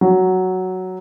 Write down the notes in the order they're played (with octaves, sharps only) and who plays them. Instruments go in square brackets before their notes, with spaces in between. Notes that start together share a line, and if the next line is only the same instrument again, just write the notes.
[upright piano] F#3